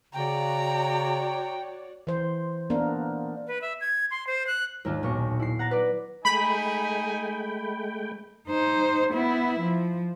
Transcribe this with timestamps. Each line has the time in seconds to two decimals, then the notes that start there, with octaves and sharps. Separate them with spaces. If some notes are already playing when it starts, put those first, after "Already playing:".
0.14 C#3 F#4 C#5 D5 G5 A#5
2.07 E3 C5
2.70 A#3 B3 D4 A#4
3.47 B4
3.62 E5
3.81 G#6
4.11 C6
4.27 C5
4.47 F#6
4.85 D#2 G#2 A#3 D4 F4
5.03 B1 A#2 C#6
5.40 E4 C7
5.59 F#5 A#5 A6 A#6
5.71 B4 D5
6.25 G#3 A3 D#4 G5 G#5 B5
8.49 D#4 C5
9.13 B3 E4
9.60 F3